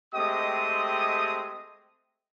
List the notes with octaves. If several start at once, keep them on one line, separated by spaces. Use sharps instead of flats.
G#3 A3 C4 G4 D#5 D#6